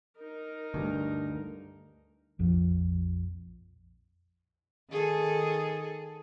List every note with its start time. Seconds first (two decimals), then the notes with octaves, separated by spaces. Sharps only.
0.18 D#4 A#4
0.74 D2 G2
2.39 A#1 F2 F3
4.90 D#3 G#4 A4